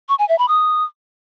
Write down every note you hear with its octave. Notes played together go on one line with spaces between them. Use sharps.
C#6
G#5
E5
B5
D#6